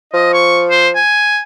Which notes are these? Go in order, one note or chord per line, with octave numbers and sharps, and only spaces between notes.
F3 D#5
C#6
C5
G#5